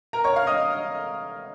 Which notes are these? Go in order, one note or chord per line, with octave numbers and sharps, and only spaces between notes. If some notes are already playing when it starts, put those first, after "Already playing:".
A#4 A#5
C#5 C#6
F5 F6
D#5 D#6